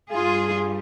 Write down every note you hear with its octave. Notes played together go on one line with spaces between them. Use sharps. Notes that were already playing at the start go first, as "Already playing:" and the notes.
G2 G3 F4 G#4